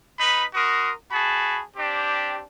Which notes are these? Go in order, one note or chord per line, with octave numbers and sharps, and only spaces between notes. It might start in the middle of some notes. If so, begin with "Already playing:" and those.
D#4 B4 B5
F#4 A#4 C6 D#6
F#4 G#4 A5 B5
C4 D4 G4